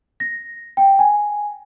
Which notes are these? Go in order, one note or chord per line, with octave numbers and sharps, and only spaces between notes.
A#6
G5
G#5